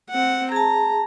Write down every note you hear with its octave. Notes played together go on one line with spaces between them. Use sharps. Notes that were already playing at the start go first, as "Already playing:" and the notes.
C4 F#5
G#4 A5 A#5